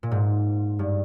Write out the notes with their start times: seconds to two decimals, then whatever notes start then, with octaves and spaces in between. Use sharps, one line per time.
0.03 A#2
0.11 G#2
0.79 G2